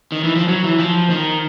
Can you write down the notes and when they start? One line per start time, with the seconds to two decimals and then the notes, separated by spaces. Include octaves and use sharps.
0.12 D#3
0.24 E3
0.36 F3
0.48 F#3
0.64 E3
0.79 F3
1.10 D#3